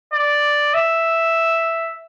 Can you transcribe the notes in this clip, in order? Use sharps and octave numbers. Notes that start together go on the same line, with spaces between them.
D5
E5